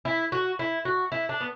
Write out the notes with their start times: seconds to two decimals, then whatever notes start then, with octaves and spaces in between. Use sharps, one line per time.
0.05 E4
0.32 F#4
0.59 E4
0.85 F#4
1.12 E4
1.29 D4
1.41 B3